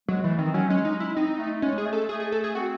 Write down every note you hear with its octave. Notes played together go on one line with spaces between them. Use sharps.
F#3 G#3
E3 A3
D#3 C4
F#3 C#4
G#3 C#4
D#4
E4
C4 D#4
A3
G#3 C#4
G#4
A3
A4
A3 G#4
G#4
A4
G#4
C4 F#4